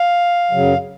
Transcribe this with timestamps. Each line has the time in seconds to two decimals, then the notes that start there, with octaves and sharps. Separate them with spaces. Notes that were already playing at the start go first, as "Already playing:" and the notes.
Already playing: F5
0.51 F#2 C#3 F#3